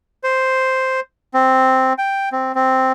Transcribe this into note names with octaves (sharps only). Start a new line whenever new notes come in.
C5
C4
G5
C4
C4